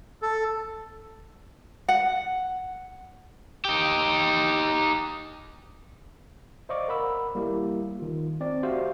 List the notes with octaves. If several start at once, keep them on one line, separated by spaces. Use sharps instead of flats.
A4
F#5
D#4 G4
C5 D5 D#5 F5 C#6 D6
A#4 F#5 B5 E6
G3 A#3 E4 G4
D#3 F4
C4 D5
F#4 G4 C5 E5 F5